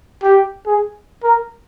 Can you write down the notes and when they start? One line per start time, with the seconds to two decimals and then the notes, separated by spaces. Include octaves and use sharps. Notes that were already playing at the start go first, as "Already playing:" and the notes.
0.23 G4
0.66 G#4
1.23 A#4